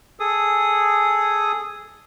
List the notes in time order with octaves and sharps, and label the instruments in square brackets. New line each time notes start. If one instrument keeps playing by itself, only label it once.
[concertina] G#4 A4 D#6